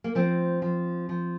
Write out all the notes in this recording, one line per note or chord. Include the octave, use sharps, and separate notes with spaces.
A#3
F3 C4
F3
F3